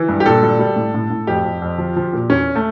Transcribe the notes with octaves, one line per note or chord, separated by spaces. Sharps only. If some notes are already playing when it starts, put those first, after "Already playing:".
Already playing: E3
G2
G4
A#2 A4
G3
G3
A2
A2
A2
F2 G4
F2
F2
F3
F3
A#2
E2 C#4
A3